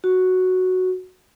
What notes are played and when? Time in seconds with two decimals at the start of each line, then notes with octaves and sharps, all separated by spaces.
0.04 F#4